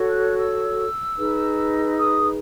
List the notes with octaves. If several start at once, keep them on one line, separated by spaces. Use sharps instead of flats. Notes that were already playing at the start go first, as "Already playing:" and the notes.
Already playing: F#4 A4 C#5
F#6
E6
D#4 G#4 B4
D#6